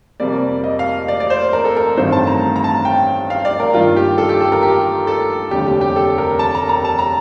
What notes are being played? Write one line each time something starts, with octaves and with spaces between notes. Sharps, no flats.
F2 C3 G3 A#3 D5
D#5
F5
D5
D5
C5
A#4
A4
A#4
A1 G2 D#3 A3 C4 C5
A5
A#5
A#5
A5
G5
F5
D5
A#4
G2 D#3 A#3 F4
G4
A4
G4
A4
A#4
G4
A4
F1 D#2 D3 G3 G4
G4
G4
A4
A#4
A5
A#5
A#5
A5
A#5